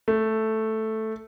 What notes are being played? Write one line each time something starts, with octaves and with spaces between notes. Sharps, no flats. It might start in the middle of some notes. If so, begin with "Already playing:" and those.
A3